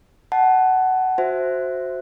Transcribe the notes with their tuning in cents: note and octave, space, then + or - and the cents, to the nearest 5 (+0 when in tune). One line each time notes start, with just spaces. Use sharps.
F#5 +15 A5 -15
F#4 -10 C5 +0 E5 +0